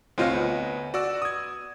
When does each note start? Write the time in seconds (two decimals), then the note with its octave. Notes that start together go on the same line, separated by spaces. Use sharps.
0.18 D2 C4 F4 C#5 D#5 F5
0.33 B3
0.94 F#4 D5 E6
1.22 D#6 G#6